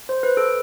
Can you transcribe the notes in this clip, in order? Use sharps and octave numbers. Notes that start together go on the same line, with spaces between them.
C5
B4
A4